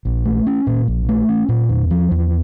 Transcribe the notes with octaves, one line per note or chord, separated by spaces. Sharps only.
A#1
A3
C#4
A#2
A#1
A3
C#4
A#2
E2
F3
E2